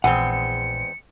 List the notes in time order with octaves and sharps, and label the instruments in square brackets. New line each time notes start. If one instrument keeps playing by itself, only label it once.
[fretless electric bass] A#1 [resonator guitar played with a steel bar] E2 G#3 C4 [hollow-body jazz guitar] F#5 [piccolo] C#7
[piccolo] C#7